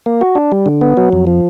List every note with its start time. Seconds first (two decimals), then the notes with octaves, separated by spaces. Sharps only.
0.06 A#3
0.21 F#4
0.35 D4
0.52 G3
0.66 D3
0.81 B3
0.97 F#3
1.13 F2
1.27 F3